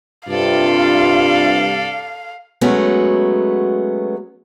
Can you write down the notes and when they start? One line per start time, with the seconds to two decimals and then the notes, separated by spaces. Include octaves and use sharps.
0.29 G2 C3 F4 A4 D5 F5
2.61 F#3 G#3 A3 B3 C#4 F#4